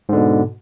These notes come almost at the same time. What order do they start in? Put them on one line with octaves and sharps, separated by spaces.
G#2 D3 B2